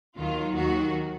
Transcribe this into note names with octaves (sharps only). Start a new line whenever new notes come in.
D#2 D#3 F#3 F4
D#2 D#3 F#3 F#4